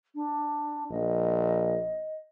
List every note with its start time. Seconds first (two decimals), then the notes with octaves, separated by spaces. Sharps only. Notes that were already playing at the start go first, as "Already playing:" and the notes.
0.14 D4
0.91 A#1 D#5